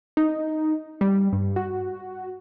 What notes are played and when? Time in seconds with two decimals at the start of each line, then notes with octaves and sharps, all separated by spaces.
0.17 D#4
1.01 G3
1.33 G2
1.56 F#4